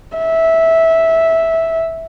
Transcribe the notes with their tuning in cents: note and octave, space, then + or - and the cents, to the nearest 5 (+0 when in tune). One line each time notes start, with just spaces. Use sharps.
E5 -10